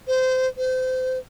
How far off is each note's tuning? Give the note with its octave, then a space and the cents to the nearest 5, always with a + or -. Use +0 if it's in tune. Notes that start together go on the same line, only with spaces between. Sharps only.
C5 -20
C5 -30